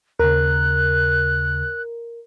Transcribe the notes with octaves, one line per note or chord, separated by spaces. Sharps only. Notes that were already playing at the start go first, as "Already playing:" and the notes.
D#2 C#3 A#4 F#6